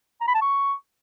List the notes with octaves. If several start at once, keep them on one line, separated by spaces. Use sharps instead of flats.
A#5
B5
A5
C#6